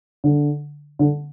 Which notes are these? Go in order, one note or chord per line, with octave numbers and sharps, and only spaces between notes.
D3
D3